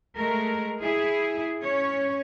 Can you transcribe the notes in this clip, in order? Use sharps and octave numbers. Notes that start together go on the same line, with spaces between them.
G#3 A3 A#4
E4 G#4
C#4 C#5